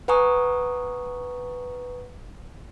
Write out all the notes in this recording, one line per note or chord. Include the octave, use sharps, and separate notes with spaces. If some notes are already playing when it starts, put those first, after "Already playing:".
B4 F#5 G#5 A#5 C#6 D#6